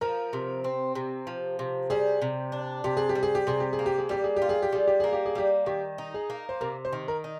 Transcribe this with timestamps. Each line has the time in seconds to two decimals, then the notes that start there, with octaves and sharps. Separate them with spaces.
0.01 F3 A#4
0.33 C3
0.64 C4
0.95 C3
1.27 F3
1.59 C3
1.90 G3 G#4
2.22 C3
2.52 D4
2.84 C3 G4
2.97 G#4
3.09 G4
3.15 G3
3.23 G#4
3.35 G4
3.47 C3 G#4
3.60 G4
3.73 G#4
3.79 A#3
3.86 G4
3.98 G#4
4.09 G3 G4
4.24 G#4
4.36 G4
4.42 F4
4.49 G#4
4.62 G4
4.72 G3 G#4
4.87 G4
5.00 A#3 G#4
5.13 G4
5.26 G#4
5.35 G3 G4
5.66 D#3 G4
5.98 D#4
6.14 G#4
6.30 A#3
6.49 C5
6.61 C3 A#4
6.85 C5
6.93 D#3
7.08 A#4
7.24 D#4